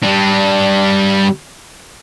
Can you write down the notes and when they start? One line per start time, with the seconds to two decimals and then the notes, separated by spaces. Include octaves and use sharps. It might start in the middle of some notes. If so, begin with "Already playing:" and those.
0.03 G3 D4